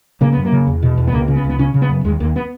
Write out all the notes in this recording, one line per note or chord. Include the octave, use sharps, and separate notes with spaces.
C#3 A#3
F#2 B3
A#3
C#3
E2
B2
E2
B3
C#2 A#3
C#3
B3
C#2
B3
C#3 C#4
C#3
B3
F#2
D#2 G#3
D#2 A#3
B3